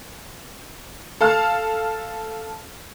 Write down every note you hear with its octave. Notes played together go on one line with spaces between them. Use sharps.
A4 F5 A5 F6